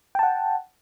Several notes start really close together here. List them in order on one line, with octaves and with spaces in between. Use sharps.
G5 A5 F#5